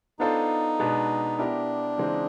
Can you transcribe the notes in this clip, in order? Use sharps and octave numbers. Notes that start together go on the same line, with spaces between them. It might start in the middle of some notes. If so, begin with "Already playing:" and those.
B3 D4 D#4 F4 A4 C5
B2 G#3 B3 D4
B3 D4 E4 G4 A#4
C#3 E3 G#3 C4 D#4